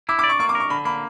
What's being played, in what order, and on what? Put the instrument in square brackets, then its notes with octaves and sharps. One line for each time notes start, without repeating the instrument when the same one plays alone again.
[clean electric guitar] E4 [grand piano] D6
[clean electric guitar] D5 [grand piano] D6
[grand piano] C#6
[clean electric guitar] A#3 [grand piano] C#6
[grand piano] D6
[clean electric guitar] A#4 [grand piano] C#6
[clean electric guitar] D3 [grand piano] B5
[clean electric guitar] A#3 [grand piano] B5